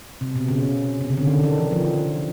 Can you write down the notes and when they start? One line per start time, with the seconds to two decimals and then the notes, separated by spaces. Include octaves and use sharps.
0.21 C3
0.36 B2
0.48 C#3
1.01 C3
1.10 C#3
1.17 D3
1.26 D#3
1.30 D3
1.44 D#3
1.58 E3
1.71 F3